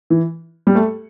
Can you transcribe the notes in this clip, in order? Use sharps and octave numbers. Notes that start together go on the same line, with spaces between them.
E3
G3
A3